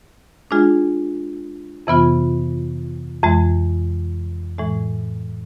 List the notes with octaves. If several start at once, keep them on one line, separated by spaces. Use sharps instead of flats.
G#3 D4 F4 G#4
F2 C3 E3 B3 F4
F2 E3 G#3
A2 E3 G#3